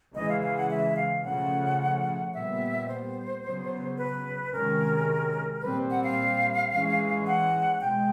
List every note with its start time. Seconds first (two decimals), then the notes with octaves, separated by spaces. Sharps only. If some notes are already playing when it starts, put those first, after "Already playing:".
0.14 C#3 E3 G#3 D#5
0.28 F5
0.41 F5
0.56 F#5
0.69 E5
0.96 F5
1.23 C#3 F3 A3 C#4 F#5
2.32 A#2 G3 B3 E5
2.87 C5
3.43 C#3 F#3 B3
3.97 B4
4.52 C3 D#3 G#3 C#4 A#4
5.61 A#2 G3 C4 B4
5.89 F#5
6.03 F5
6.71 E3 G#3 C#4
7.26 F#5
7.80 B2 G#3 G5